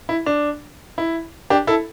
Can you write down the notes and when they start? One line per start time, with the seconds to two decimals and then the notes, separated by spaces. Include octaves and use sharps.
0.09 E4
0.26 D4
0.98 E4
1.50 D4 G4
1.67 E4 A4